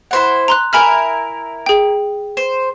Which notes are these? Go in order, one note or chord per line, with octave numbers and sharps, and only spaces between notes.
E4 C5 F#5
A#5 C6 F#6
E4 A#4 G#5 B5 F6
G#4 G5
C5